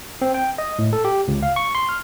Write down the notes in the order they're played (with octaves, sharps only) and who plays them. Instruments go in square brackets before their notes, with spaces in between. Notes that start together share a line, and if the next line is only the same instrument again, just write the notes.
[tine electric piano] C4
G5
D#5
A2
A4
G4
C#2
F5
C#6
C6
F6